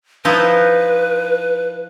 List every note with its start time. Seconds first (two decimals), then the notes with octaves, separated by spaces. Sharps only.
0.25 F3 D#4 E4 B4